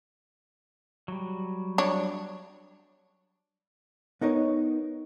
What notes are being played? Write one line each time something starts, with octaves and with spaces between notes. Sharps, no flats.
F#3 G3
D4 C#5
B3 D#4 A#4 C#5